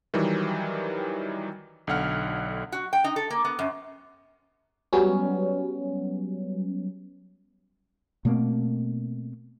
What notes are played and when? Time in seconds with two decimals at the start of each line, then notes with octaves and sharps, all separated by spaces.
0.14 D#3 E3 F#3 G3
1.87 B1 D3 F#5 F6
2.72 F#4
2.93 G5
3.04 D#4
3.16 A4
3.30 A#3
3.45 B3
3.59 F#2
4.93 F#3 G3 B3 C#4
8.25 B2 A3 A#3 C4